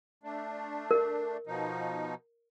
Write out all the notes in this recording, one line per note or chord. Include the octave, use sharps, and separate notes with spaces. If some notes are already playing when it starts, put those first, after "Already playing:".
A3 D4
A#4
B2 F3 D#4